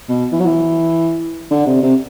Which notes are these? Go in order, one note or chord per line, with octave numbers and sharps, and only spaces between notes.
B2
E3
F#3
E3
D3
C3
C3